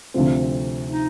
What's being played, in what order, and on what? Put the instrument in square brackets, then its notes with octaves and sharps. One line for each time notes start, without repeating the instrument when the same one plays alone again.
[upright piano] D2 C3 F3 C4
[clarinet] D#4